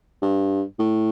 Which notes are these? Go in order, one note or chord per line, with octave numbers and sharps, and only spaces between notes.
G2
A2